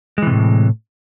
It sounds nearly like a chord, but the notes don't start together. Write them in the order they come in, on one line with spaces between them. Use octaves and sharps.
G#3 E3 C3 A2